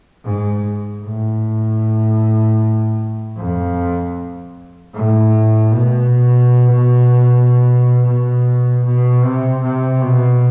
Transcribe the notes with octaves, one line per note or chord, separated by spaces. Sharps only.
G#2
A2
F2
A2
B2
B2
B2
C3
C3
B2